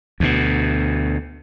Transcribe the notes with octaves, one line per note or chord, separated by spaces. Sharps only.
D2 B2